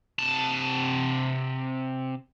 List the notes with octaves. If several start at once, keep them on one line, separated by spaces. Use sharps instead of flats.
C3 A5